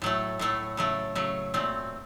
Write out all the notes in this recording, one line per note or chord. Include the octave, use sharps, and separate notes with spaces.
A2 F#3 A3
A2 F#3 A3
C#3 F#3 A3
C#3 F#3 A3
A#2 F#3 A3 C4